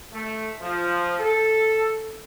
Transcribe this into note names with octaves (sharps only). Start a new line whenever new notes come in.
A3
F3
A4